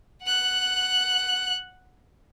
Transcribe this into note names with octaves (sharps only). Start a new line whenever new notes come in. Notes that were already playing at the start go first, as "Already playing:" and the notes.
F#5 F#6